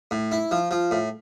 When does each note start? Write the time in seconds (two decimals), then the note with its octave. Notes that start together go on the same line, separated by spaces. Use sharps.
0.11 A2
0.32 E4
0.51 F3
0.71 F3
0.91 A2